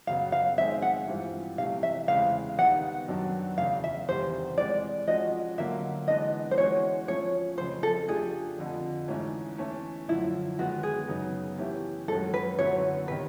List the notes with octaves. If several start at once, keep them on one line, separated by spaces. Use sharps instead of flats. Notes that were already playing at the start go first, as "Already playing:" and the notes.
F#2 C#3 F#3 B3 F5
F5
D#3 G#3 C4 D#4 G#4 E5
F#5
G2 E3 G3 C4 F4
C3 E3 A3 F5
E5
E2 C#3 E3 G#3 C4 F5
G#2 D#3 G3 B3 D#4 F#5
F#2 D#3 F#3 B3 D4
E2 C#3 E3 A3 F5
E5
E2 C3 D#3 G3 C5
E3 G#3 C4 D5
F3 G#3 C#4 F#4 D#5
D3 F#3 A#3 E5
E3 G#3 B3 D4 D#5
C5
E3 G#3 C#4 F#4 C#5
F3 A3 C#4 C#5
F2 C#3 F3 C5
A4
F3 A3 D4 G4 G#4
F2 D3 F3
G#2 E3 A3 C#4
E3 A3 C#4
F#2 D3 F3 E4
D#3 G#3 B3 F#4
G#4
F#2 C#3 F#3 B3 D#4
E3 A3 C#4 E4 G4
F#2 D#3 G#3 C#4 F#4 A4
B4
F#2 D3 F#3 B3 E4 C#5
C3 D#3 B4